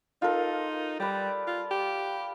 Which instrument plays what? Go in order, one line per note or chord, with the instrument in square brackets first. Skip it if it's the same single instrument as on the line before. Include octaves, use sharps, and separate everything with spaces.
[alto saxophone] D#4 [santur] F4 A4 A#4
[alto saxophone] G3 [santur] B4 D5
[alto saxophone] F4
G4